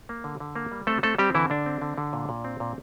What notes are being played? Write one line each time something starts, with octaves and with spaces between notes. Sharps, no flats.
A#3
D3
D3
A#3
G3
A3 C4 A4
A3 C4 A4
G3 C4 G4
D3 E3 E4
D3 D4
C4
D3
D3
A#2
A#2
C4
A#2